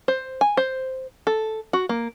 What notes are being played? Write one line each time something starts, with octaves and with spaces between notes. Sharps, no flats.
C5
G#5
C5
A4
F#4
A#3